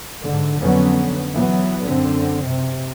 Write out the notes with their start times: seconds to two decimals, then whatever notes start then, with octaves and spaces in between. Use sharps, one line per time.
0.25 G#2 D3
0.62 F2 D3 F#3 B3 C#4
1.34 E3 F#3 B3
1.84 F#2 D3 C4
2.44 C3